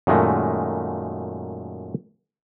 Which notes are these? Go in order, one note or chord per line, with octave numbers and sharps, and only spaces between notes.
F#2 A#2 D#3 G#3 A3